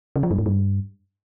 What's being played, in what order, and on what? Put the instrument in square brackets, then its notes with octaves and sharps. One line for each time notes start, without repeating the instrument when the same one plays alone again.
[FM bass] C#3
F3
G2
G#2
G2